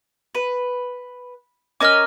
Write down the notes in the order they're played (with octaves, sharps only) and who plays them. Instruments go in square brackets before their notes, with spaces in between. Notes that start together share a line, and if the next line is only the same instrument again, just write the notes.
[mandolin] B4
[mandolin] C#4 A#4 D#5 [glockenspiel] D6 F6